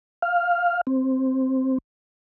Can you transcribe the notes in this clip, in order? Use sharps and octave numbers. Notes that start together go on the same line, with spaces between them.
F5
C4